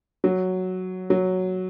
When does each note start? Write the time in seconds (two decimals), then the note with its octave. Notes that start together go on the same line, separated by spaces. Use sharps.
0.24 F#3
1.10 F#3